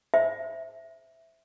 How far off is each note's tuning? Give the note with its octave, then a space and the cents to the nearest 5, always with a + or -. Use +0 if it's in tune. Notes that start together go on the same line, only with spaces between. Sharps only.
C5 +0 E5 +0